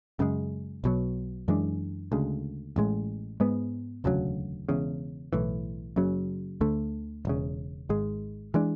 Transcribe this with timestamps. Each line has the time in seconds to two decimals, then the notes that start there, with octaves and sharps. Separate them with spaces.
0.19 F#2 C#3 G#3
0.84 B1 B2 F#3
1.48 F#2 E3 G#3 D4
2.12 D2 C#3 G#3
2.76 A1 A2 G#3
3.40 G#2 G#3 B3
4.04 E1 D2 C#3 F#3
4.69 E1 E2 C#3
5.33 B1 A2 E3
5.96 F#1 F#2 C#3 F#3
6.61 D2 D3 A3
7.25 E1 E2 C#3
7.89 G#1 G#2 G#3
8.54 E3 G#3 D4